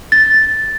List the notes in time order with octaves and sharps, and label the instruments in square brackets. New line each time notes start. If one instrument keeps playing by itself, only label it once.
[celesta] A6